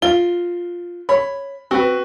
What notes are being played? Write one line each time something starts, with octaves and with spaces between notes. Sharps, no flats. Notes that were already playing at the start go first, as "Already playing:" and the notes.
F4 G7
C#5 B5
C4 F#4 B4